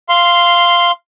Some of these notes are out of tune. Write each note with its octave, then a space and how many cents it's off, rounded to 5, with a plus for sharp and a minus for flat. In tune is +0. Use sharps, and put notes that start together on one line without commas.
F5 -10 C6 +0